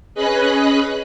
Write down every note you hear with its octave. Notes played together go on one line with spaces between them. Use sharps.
C#4 G#4 B4 D#5 B5 F#6